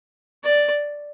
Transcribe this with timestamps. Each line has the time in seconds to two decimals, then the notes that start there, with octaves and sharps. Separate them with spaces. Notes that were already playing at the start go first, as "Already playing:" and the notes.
0.44 D5